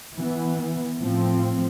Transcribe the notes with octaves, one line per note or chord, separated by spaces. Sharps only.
E3 B3
A2 F3 C4